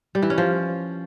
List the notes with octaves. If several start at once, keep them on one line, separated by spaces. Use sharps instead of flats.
G3
E3
C#4
F3